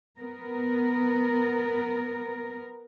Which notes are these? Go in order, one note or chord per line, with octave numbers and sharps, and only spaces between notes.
B3 A#4